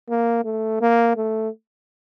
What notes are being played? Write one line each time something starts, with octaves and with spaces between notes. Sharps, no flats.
A#3
A3
A#3
A3